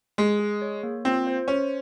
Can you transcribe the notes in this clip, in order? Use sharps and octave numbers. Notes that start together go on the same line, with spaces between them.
G#3 G#4
G#4
C#5
A#3
C4 F4
C5
C#4 C5